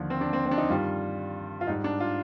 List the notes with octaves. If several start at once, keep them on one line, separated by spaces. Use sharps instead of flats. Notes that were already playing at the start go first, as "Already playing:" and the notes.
Already playing: D#2 D3 F3
C4
D4
C4
C4
D4
D#4
G2 D#3 G3 F4
F4
G#2 G3 D#4
D4
F4